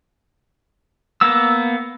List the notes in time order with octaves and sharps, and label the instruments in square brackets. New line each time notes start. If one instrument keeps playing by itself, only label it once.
[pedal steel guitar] A#3 B3 E6